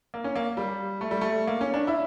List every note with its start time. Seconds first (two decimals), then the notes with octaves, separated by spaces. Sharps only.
0.14 A#3
0.24 C#4
0.36 A#3
0.57 G3
1.01 A3
1.11 G3
1.21 A3
1.47 A#3
1.61 C#4
1.74 D4
1.87 E4